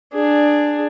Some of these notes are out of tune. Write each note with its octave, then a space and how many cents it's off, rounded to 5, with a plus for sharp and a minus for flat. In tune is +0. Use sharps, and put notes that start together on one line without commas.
D4 +10 G#4 +0